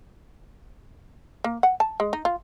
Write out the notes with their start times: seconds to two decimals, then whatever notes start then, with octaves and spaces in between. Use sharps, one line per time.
1.44 A#3
1.63 F#5
1.80 A5
2.00 G#3
2.13 D#4
2.25 F4